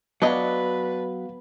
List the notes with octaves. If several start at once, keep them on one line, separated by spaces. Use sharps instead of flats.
F#3 B3 D4 B4 D#5 F5